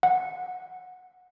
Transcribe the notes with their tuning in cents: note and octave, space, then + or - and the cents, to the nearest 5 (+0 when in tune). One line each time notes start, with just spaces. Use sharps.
F#5 -10